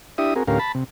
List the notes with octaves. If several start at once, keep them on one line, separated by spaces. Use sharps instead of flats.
D4 E4 G4 E5 D#6
C4 F#4 G#4 A#4
D2 A2 C#4 G4 A#4 F5
A5 B5
C3